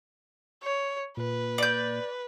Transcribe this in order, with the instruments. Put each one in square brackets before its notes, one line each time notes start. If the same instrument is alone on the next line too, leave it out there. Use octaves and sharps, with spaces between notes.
[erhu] C#5
[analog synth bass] A#2 [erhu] B4
[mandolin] D5 G6